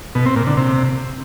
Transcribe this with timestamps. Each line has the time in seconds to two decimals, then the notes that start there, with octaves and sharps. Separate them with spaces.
0.15 B2
0.26 C4
0.36 A#2
0.47 D3
0.57 C3